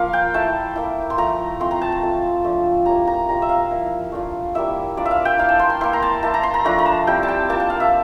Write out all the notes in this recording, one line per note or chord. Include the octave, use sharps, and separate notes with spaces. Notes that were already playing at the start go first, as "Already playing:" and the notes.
Already playing: F3 A#3 F4 F5
G5
A3 E4 A5
A#3 E4
C6
F3 A3 E4 A#5
A3 C4 F4 C6
A#5
A5
A5
A3 C4 F4
F3 A3 D4
G3 A#3 E4 A#5
A#5
G3 A#3 F4 A#5
E5
F5
F3 A#3 E4
A3 D4 F4
G3 A#3 E4 E5
A#3 D4 F4 D5
E5
F5
G5
A#3 E4 F5
A5
C6
C6
A#3 E4 C6
A#5
A5
A#3 E4 A5
A#5
C6
A#5
F3 A3 D4 F4 A#5
A#5
A5
G3 C4 E4 G5
A5
G5
A#3 F4 A5
A5
F5
E5